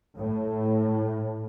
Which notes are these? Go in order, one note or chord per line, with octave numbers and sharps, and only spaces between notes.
A2